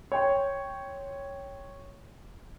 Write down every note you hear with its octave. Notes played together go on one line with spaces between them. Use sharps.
C#5 G5 C6